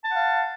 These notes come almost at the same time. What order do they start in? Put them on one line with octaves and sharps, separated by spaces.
A5 F#5 F5